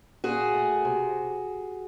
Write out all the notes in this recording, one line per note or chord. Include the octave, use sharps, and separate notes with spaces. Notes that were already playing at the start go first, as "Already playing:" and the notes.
A#2 F#4 G#4
A3
C3